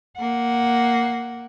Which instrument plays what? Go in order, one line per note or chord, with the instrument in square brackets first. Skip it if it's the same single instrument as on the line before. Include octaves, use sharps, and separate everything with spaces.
[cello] A#3 F#5